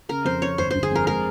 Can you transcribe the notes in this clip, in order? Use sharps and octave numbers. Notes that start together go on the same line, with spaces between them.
C#3 A#4
F2 C5
C4 C#5
G1 C5
G1 C5
G#4
F2 A#4
G#3 A#4